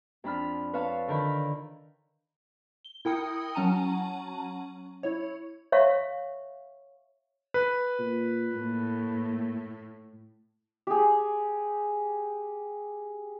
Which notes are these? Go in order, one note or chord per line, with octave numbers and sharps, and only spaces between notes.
F2 D4 B5 F6
B4 C#5 F5 A5
D3 D#3 A#4 B5
G7
E4 A#4 G5 D#6 C#7
F#3 C#4 F#5 A5 A#5 D#7
E4 C#5
C#5 E5 F5 C#6
B4
A#2
A2 A#3
G4 G#4